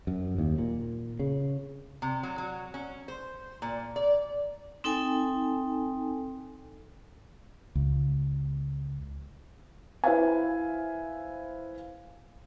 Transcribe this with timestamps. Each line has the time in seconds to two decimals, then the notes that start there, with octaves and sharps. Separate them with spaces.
0.07 F#2
0.38 D#2
0.58 A#2
1.20 C#3
2.02 C3
2.23 F#3
2.38 F#3
2.74 C#4
3.08 C5
3.62 A#2
3.96 D5
4.84 C4 D#4 A4 G5 G#5
7.75 C#2
10.04 E4 B4 C5 E5 F5 G#5